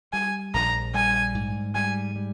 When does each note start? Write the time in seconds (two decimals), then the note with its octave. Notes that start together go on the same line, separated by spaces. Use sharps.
0.13 G3 G#5
0.54 A#1 A#5
0.94 G3 G#5
1.35 G#2
1.75 G3 G#5
2.16 G3